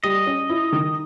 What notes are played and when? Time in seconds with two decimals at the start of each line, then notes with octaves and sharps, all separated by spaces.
0.04 G3 D#5
0.27 C#4
0.50 E4
0.72 D#3